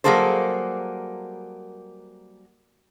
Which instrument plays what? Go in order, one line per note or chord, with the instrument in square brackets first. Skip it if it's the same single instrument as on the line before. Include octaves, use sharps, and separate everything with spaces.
[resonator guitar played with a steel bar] F#3 G3 A#3 G#4 A4 C5